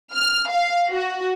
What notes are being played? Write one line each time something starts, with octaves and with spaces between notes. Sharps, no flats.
F6
F5
F#4